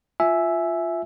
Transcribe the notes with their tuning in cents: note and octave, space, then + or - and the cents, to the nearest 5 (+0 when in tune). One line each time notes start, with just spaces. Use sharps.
F4 +0 E5 +0 G#5 +10